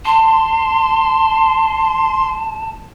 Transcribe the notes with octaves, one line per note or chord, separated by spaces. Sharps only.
A5 C6